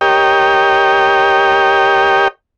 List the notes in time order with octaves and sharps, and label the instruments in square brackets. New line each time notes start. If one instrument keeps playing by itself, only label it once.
[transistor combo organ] G4 A#4 C#5 D#5 G5